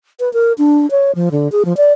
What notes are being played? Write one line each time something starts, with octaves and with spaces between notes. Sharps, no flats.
B4
A#4
D4
C#5
F3
D3
G#4
F3
D5